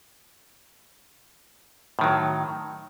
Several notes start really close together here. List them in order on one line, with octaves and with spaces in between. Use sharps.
A2 D#3 F#3